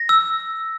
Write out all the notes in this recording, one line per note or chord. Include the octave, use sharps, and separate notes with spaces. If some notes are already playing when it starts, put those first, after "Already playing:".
Already playing: A#6
E6